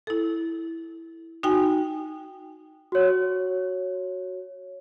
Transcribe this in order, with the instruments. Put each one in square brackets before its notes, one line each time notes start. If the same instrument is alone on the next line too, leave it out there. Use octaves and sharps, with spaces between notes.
[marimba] E4 A4
D#4 F#4 G5 G#5
[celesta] F#4 C#5